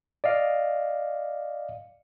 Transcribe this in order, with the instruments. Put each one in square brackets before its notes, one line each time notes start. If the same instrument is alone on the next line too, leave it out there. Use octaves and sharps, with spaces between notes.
[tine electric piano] D5 D#5 F5